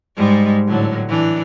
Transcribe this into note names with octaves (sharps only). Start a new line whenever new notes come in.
G#2 G3 G#3
A2 D3 F#3
E3 D4